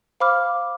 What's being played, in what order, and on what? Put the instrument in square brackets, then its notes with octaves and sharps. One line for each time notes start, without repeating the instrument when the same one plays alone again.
[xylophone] C5 F5 B5 D6 F6